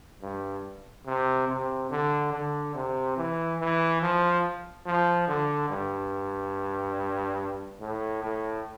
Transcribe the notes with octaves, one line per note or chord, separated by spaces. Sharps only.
G2
C3
C3
D3
D3
C3
E3
E3
F3
F3
D3
G2
A2
A2